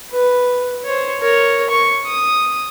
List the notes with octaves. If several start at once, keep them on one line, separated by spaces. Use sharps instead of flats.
B4
C5 C#5
A#4 C#5
C#6
D#6